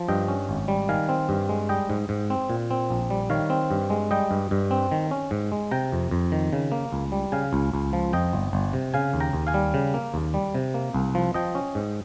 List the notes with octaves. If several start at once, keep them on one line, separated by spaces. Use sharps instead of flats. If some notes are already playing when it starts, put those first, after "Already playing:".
Already playing: F3
G2 D#5 G5
C#4
G#1
G3
D#3 F5 G#5
C4
G2
G#3
G3 D#5 G5
G#2
G#2
C4
A#2
C4
A#1
G3
D#3 C#5 F5
C4
G2
G#3
G3 D#5 G5
G2
G2
C4
D#3
C#4
G#2
G#3
C3 G5 A#5
F2
F2
D#3
C#3
A#3
C#2
G3
C#3 F5 G#5
C#2
C#2
F3
F2 D#5 G5
G1
G1
C3
C#3 F5 G#5
D#2
G5 A#5
D#2
F5 G#5
G3
C#3
A#3
D#2
G3
C3
A#3
C2
F3
F3 D#5 G5
C#4
G#2